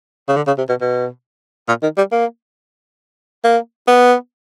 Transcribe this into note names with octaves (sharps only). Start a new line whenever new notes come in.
C#3
D3
C#3
C3
B2
B2
A#2
D#3
G3
A#3
A#3
B3